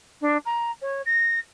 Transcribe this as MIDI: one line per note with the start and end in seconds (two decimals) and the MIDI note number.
0.21 0.37 62
0.45 0.71 82
0.82 1.02 73
1.06 1.39 94